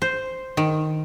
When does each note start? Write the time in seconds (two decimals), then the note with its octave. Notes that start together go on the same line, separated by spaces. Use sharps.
0.02 C5
0.57 D#3